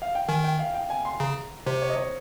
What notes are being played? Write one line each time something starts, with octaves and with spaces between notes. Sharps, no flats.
F5
G5
D#3 G#5
G5
F5
G5
G#5
C6
C#3 A#5
C3 C5
C#5
D#5
C#5